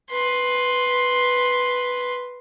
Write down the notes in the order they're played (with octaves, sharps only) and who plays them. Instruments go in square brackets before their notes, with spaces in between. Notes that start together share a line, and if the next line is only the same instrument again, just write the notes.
[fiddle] B4 C6